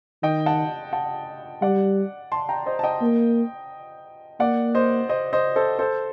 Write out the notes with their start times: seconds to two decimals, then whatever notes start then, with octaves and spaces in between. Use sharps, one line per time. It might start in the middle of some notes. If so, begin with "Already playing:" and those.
0.23 D#3 D#5 G5
0.46 F#5 A5
0.93 F#5 A5
1.62 G3 D5 F#5
2.32 A5 C6
2.49 G5 A#5
2.66 C5 D#5
2.79 A5
2.83 D#5 G5
3.02 A#3
4.40 A#3 D5 F#5
4.75 C5 D#5
5.09 C5 D#5
5.33 C5 D#5
5.56 A4 C5
5.79 A4 C5